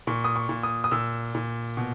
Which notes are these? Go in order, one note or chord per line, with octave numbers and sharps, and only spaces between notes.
A#2 C#6
D#6
C#6
A#2
D#6
D#6
A#2 E6
A#2
B2